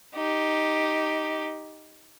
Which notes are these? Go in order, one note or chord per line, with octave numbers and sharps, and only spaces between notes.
D#4 G4